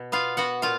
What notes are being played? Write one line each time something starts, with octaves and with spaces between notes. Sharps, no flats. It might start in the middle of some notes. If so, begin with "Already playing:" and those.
Already playing: B2
B3 F4 F5
B3 F#4 F#5
A#2 F4 F5